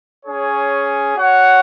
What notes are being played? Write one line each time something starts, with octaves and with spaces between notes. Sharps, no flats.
C#4 G#4 C#5
F#4 C#5 F#5